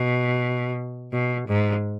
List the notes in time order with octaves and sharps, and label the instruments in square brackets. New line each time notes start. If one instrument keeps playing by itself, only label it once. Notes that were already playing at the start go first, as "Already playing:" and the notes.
Already playing: [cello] B2
B2
G#2